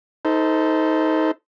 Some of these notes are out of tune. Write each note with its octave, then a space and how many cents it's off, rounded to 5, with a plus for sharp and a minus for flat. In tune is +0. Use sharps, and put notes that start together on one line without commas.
D#4 +25 A4 +5 C5 -15